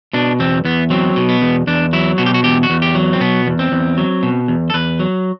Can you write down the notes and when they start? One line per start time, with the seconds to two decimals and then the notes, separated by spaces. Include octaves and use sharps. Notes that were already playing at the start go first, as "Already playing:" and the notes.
0.13 B2 D4
0.40 E2 C4
0.65 E2 B3
0.90 F#3 C4
1.16 B2
1.29 B3
1.42 E2
1.67 E2 D4
1.93 F#3 E4
2.18 B2 F#4
2.26 G4
2.34 F#4
2.44 E2 G4
2.63 F#4
2.70 E2
2.82 G4
2.95 F#3
3.13 C4
3.21 B2 B3
3.47 E2
3.59 C4
3.72 E2
3.97 F#3
4.23 B2
4.48 E2
4.70 A4
4.74 E2 B4
4.99 F#3